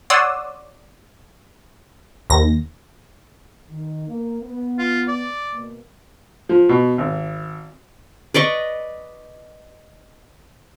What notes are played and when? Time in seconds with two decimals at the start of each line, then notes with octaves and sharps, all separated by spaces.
0.10 C#5 D5 F#5 C6 D#6 E6
2.30 D#2 A#6
3.70 D#3
4.08 A#3
4.42 B3
4.78 F4
5.08 D5
5.52 B2 A#3
6.49 F3
6.69 B2
6.98 G#1
8.34 B4 D5 D#5 C#6